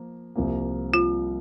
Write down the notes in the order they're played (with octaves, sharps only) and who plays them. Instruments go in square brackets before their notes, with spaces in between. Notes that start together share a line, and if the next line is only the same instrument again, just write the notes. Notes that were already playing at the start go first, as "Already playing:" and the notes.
Already playing: [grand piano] F3 A#3
C2 C3 F3 A#3
[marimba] F4